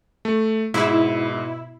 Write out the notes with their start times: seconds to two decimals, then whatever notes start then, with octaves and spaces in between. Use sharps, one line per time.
0.25 A3
0.74 G#2 B2 E4